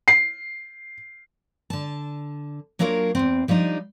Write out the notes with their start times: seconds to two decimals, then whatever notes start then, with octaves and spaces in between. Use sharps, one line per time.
0.08 C7
1.70 D3 A5
2.79 F#3 A#3 D4 F4 A#4 C#5
3.15 E2 E3 C4
3.48 F3 G3 D4 D#4